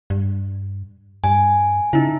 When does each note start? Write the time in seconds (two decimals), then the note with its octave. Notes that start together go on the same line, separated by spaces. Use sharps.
0.10 G2
1.24 G2 G#5
1.93 C#3 D#4 E4